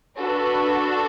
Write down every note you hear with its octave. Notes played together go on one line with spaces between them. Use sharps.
D4 F#4 A4 B4